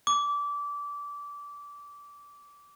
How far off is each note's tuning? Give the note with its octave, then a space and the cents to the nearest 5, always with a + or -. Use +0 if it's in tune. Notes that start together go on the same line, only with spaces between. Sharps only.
D6 -20